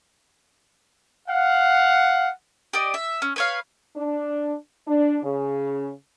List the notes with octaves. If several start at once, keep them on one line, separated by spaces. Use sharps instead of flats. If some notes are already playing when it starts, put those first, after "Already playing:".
F5 F#5
G4 D5 D#5
E5
C#4
B4 C#5 F5
D4
D4
C#3